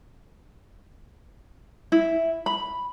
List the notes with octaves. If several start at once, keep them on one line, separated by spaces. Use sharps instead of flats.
E4
B5